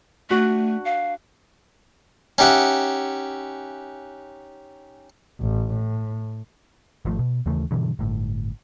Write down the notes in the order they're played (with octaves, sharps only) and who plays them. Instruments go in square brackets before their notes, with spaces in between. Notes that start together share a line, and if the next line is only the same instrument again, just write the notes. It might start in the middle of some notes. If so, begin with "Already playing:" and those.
[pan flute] A3 [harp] D4 F#4
[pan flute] F5
[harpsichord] C#4 D#4 G4 E5 F#5
[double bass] A1
A2
[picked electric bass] G#1 F3 A3
B2
D#2 C#3 E3 A3
G2 B2 D3 E3
G1 A2